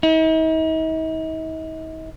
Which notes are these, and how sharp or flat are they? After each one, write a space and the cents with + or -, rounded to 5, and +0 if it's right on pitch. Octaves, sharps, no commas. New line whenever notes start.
D#4 +45